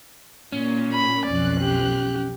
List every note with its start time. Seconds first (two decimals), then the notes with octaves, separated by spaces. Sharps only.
0.52 A#2 C#4
0.93 B5
1.26 B1 F2 D5 F#6
1.61 G4